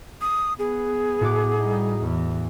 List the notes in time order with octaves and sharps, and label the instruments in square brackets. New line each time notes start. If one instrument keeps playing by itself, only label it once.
[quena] D#6
[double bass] B3 [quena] G#4
[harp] A2 F#4 D6
[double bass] G3 D#4
E2